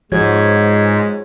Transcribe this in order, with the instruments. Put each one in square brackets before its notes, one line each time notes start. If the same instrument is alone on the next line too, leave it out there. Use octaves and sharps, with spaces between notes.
[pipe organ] G#2 [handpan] F3 F#4 [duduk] G#3 [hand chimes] G#4 C#5 G#6